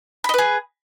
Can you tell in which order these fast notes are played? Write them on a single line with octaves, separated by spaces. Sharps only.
B5 D#5 B4 G#4